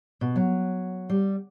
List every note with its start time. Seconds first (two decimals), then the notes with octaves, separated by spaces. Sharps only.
0.21 B2
0.36 F#3
1.10 G3